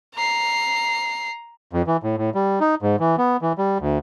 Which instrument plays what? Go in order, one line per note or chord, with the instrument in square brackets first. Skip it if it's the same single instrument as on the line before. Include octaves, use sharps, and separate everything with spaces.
[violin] A#5 C7
[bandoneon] F2
E3
A2
A2
G3
D#4
G#2
E3
B3
E3
G3
D2